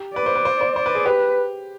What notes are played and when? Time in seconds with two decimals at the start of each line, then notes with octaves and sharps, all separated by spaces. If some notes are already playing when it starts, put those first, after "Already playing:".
Already playing: G4
0.16 B4 D5
0.26 C5
0.35 B4
0.45 C5
0.61 C5
0.76 C5 D5
0.86 B4
0.95 G#4
1.06 G4 B4